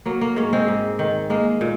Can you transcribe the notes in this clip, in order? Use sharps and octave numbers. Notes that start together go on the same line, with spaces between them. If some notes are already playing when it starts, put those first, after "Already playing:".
F#3 A#3
A#3
G#2 A#3 C#4
G#3 C4
G#2
D#3
G#3 A#3
A#2